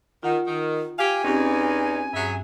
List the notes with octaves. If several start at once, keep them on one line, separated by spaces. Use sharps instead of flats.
D#3 F4 F#5
D#3
G4 F5 G#5
E2 C4 C#4 D#4 G4
G2 F#3 G#4 E5